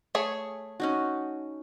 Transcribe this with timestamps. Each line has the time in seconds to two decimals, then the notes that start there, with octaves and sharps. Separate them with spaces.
0.15 A3 G#4 C#5
0.80 C#4 D#4 F#4